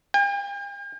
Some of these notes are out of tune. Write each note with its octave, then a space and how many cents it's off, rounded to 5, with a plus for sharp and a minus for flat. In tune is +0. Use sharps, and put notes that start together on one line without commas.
G5 +45